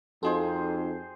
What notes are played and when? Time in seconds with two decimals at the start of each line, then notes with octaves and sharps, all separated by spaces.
0.23 F2 C4 D#4 F#4 G#4 A4 C5